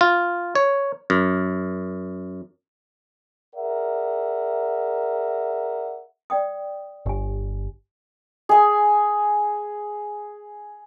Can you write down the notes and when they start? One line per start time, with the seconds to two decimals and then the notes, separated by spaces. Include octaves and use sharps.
0.01 F4
0.55 C#5
1.10 F#2
3.55 G#4 A#4 D5 E5 F#5
6.30 D5 G5 D#6
7.06 G1 G4 G#5
8.49 G#4 G#5